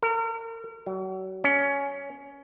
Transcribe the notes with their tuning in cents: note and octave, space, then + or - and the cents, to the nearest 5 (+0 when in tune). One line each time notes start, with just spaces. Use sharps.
A#4 -35
F#3 +35
C#4 +15